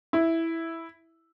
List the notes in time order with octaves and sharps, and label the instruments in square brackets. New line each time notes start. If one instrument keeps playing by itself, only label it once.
[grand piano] E4